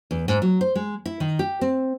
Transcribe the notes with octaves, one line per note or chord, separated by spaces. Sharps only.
E2
G#2
F#3
C5
G#3
E4
D#3
G4
C4